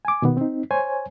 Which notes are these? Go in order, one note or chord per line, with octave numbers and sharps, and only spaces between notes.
G#5 D6
B2 D#3 B3
C4 D#4
C5 C#5 G#5